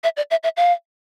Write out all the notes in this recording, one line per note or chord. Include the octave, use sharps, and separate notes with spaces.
E5
D5
E5
E5
F5